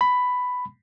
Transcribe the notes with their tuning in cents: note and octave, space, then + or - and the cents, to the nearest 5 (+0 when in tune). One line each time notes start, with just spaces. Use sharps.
B5 +10